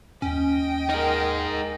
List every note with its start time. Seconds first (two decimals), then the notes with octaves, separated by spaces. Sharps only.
0.22 D#2 C#4 D#5 G5
0.89 D#4 G#4 A#4